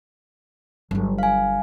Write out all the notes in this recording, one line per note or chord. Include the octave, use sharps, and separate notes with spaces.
G1 F#3
F5 G#5